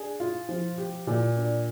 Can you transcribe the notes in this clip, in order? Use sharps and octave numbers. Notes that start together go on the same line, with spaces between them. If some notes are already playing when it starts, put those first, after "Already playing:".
Already playing: D4 G#4
F4
F3
G4
A#2
D4